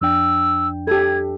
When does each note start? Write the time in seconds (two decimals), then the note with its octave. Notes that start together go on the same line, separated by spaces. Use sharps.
0.01 F2 D4 G5 E6
0.87 G4 A4 G#6